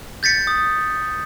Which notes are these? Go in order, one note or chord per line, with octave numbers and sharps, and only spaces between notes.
G6 A6 B6 C#7
D#6